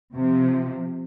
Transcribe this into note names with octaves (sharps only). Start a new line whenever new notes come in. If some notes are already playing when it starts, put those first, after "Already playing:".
C3 F3